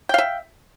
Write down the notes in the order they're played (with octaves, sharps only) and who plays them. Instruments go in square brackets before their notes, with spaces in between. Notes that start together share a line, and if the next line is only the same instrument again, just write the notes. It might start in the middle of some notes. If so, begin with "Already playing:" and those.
[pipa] G5
F5
E5